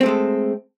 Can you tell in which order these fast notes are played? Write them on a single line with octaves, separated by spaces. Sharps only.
C4 A3 G#3 A4